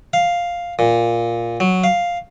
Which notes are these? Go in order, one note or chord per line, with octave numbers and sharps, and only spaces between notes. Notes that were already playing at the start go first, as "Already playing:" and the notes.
F5
A#2
F#3
F5